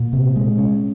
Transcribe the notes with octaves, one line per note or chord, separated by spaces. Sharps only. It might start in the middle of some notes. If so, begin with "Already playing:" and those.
Already playing: A#2
C3
G#3
C#4